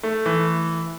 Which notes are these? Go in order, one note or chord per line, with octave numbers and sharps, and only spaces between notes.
A3
E3